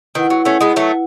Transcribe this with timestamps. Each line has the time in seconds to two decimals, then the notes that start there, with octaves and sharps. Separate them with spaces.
0.15 D#3 E4 B4 F#5
0.30 F#3
0.45 A3 C#4
0.61 G#3 B3
0.76 F#3 A3